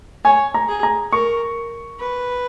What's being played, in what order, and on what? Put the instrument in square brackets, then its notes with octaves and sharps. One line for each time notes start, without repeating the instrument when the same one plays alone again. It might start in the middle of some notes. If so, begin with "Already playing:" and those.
[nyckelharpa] C#5 [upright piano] G#5
[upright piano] A#5
[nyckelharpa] G#4
[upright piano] A#5
[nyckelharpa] A#4 [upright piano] C#6
[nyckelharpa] B4